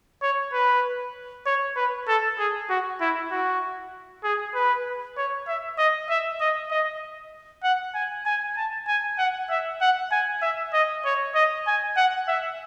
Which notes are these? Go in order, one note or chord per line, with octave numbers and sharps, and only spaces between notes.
C#5
B4
C#5
B4
A4
G#4
F#4
E4
F#4
G#4
B4
C#5
E5
D#5
E5
D#5
D#5
F#5
G#5
G#5
A5
G#5
F#5
E5
F#5
G#5
E5
D#5
C#5
D#5
G#5
F#5
E5